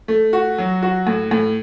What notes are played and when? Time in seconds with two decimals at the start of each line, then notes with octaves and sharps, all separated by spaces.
0.08 A3
0.33 F#4
0.58 F#3
0.82 F#4
1.07 A2
1.31 A2